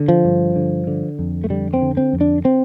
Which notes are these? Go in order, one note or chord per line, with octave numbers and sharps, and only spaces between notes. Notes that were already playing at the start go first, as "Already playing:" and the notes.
Already playing: D3
F3
G2
D3
D3
F2
A3
D3 G3
C4
D3
C4
F2
D4
C4